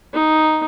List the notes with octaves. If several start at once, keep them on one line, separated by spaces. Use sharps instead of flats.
D#4